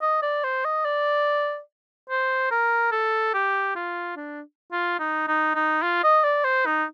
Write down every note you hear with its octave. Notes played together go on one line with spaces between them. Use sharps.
D#5
D5
C5
D#5
D5
C5
A#4
A4
G4
F4
D4
F4
D#4
D#4
D#4
F4
D#5
D5
C5
D#4